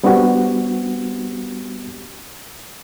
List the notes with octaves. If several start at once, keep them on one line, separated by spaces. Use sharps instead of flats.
G3 B3 C4 D4 F#4 G4